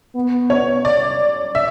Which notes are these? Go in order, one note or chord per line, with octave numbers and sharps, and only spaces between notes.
B3
C#5
D5
E5